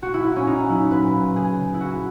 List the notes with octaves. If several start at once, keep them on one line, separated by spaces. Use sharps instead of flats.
A#2 F#4
E4
A#2 E4
C#4
A#2 D#4
F#3 E4
A#2 B4
A#2
C#3 G#4
C#3
E4
A#2 F#4